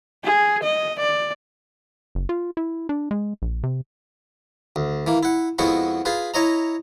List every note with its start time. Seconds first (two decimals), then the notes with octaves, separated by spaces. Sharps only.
0.24 G#4
0.64 D#5
1.00 D5
2.15 F#1
2.29 F4
2.57 E4
2.89 D4
3.11 G#3
3.42 A#1
3.63 C3
4.76 D2
5.07 E3 A#3
5.23 E4 F#5
5.59 F2 G#3 B3 E4 F#4 C#6
6.05 F4 G#4 B4
6.34 E4 C#5 D#5 A#5